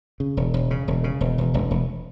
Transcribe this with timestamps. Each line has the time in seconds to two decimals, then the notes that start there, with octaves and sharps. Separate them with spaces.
0.20 C#3
0.37 E1
0.54 E1
0.71 C#3
0.88 E1
1.04 C#3
1.21 E1
1.38 E1
1.54 E1
1.71 E1